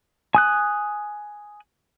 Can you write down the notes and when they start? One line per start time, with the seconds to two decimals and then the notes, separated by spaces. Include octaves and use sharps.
0.35 G#5 D#6 F#6